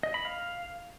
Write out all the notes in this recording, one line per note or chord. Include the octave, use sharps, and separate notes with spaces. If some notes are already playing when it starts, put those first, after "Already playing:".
D#5
B5
F5